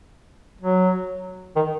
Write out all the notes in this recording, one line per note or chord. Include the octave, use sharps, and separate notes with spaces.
F#3
D#3